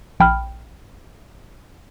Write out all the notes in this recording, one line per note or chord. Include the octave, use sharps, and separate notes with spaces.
A#1 G5 B5 F6